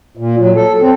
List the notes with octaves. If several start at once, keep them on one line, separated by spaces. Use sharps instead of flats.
A#2
F#3
A4
C4